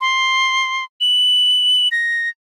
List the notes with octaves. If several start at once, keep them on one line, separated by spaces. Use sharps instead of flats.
C6
F#7
A#6